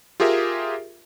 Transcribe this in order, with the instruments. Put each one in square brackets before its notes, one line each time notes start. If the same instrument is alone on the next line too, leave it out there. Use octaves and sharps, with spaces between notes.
[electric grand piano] F4 G4 G#4 A#4 E5